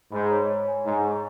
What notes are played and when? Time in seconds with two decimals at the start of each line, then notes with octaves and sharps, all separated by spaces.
0.12 G#2 B5
0.31 C#5
0.49 C#5
0.68 G#5
0.85 G#2 A#5
1.05 C#6